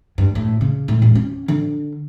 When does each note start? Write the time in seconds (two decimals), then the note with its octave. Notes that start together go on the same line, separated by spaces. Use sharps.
0.18 G2
0.35 A2
0.61 C#3
0.88 A2
1.02 E1
1.15 C#4
1.48 D3